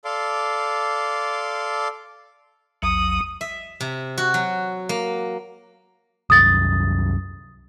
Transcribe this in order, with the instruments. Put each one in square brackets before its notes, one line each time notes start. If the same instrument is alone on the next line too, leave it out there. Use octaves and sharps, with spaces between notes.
[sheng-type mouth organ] A4 D5 F5 C6 D6
[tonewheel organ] A#1 E2 F#3 [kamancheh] D#6
[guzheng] E5
C3
F#4
F#3
A#3
[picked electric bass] C2 F#2 [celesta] D#6 A6